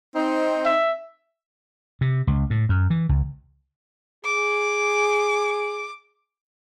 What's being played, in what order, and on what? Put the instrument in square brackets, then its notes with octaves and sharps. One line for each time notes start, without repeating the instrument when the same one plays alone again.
[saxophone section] C4 D#4
[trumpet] E5
[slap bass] C3
C#2
A2
F#2
E3
C#2
[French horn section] G#4 [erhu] D6